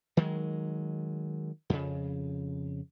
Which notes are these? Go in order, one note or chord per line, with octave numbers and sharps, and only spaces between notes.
D#3 F#3 G#3
F2 C#3